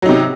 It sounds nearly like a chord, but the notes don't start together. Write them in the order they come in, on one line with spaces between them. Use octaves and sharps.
F#3 D#4 C3